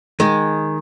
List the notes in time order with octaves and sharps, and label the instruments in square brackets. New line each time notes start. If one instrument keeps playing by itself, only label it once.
[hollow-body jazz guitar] D#3 G#3